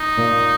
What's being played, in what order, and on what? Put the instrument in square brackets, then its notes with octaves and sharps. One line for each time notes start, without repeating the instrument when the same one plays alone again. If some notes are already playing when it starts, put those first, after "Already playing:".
Already playing: [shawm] D#4
[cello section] A#2